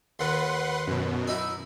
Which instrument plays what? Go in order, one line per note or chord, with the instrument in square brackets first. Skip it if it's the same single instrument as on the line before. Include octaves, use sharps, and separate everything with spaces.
[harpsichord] D#2 [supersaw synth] B4 F#5 C6
[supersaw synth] F#2 B2
[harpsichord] D#4 E4